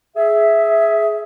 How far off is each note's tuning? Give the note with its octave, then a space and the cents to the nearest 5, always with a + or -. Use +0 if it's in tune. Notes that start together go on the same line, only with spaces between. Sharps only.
G#4 +15 E5 +0